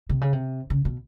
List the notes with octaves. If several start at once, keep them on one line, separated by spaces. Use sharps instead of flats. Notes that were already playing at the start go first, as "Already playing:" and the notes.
C3
C#3
C3
C#3
B2